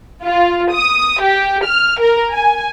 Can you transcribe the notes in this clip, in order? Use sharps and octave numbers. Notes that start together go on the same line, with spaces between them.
F4
D#6
G4
F6
A#4
G#5